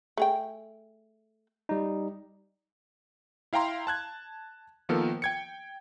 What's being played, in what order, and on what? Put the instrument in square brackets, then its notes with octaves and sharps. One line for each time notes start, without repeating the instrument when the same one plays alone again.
[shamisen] A3 G#4 G5
[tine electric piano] G3 D#4
[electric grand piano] E4 F5 G5 A#5 C6
A5 F#6 G#6
D#3 F3 A#3 B3 A4 A#4
G5 G#6 C#7